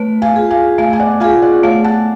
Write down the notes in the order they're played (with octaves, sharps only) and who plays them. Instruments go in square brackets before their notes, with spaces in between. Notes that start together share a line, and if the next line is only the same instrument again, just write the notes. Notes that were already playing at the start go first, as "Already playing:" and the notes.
Already playing: [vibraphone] A3 [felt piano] B4 C#5
[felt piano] F5 G#5
[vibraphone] F4 G#4
[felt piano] F5 G#5
[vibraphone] A3 [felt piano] F5 G#5
[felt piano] G#5
D5 F#5
[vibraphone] F4 [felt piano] F5 G#5
[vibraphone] G#4
[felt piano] D5 F#5
[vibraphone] A3 [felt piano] C#5 F5
[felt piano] F#5 A5